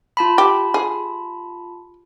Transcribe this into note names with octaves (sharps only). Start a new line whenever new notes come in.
F4 A5 B5
G4
G#4